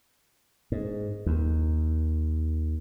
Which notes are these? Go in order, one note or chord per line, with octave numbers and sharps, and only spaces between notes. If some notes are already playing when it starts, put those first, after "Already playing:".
G#2
D#2